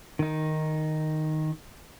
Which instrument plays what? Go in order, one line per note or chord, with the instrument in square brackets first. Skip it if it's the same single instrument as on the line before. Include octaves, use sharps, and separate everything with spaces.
[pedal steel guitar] D#3 D#4